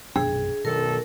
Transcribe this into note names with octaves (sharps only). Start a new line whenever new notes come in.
A#1 F#2 B2 D4 G#4
B1 B2 D#3 A4 A#4